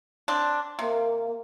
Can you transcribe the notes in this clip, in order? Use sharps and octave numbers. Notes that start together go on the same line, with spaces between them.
C4 D4
C3 A#3